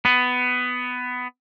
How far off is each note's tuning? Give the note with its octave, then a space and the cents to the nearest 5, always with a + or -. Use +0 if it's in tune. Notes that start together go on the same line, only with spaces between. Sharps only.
B3 +15